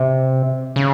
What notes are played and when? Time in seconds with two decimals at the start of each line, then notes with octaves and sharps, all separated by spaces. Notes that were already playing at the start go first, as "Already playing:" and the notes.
Already playing: C3
0.76 C#3